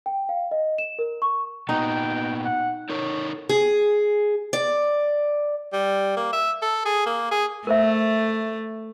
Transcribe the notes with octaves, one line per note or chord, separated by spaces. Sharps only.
G5
F5
D#5
E7
A#4
C#6
A#2 B3 D#4 G5
F#5
D#4 A4 A#4 C#5
G#4
D5
G3
A#3
E5
A4
G#4
A#3
G#4
A3 A#4 C5 E5